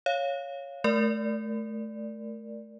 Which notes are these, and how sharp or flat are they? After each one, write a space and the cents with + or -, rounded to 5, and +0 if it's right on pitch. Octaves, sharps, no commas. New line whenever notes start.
C#5 +0 F5 +0
A3 -20 A#4 +0 D5 +0